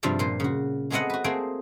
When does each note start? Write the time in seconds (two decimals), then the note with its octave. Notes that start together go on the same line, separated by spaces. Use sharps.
0.03 G2 C3 F3 F4 D5
0.19 A#2 C5
0.40 C#3 F#4
0.90 G#3 A3 B3 C4 D#5 F#5
1.10 F#4 B4
1.24 A3 A#3 C4 G#4 G5